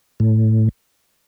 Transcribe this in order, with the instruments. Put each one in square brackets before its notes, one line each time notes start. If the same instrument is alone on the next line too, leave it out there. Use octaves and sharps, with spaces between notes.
[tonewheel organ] A2